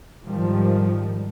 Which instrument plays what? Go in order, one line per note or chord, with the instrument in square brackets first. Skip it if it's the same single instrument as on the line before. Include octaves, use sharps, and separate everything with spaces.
[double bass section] G#2 D#3 F3 G3